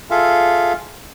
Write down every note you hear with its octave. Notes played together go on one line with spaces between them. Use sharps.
F4 G#4 A4 E5 F5